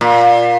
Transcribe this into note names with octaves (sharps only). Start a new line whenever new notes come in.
A#2